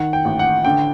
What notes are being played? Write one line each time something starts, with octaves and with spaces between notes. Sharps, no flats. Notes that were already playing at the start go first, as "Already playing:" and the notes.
Already playing: D#3 F#5
G5
A1
F#5
D3 G5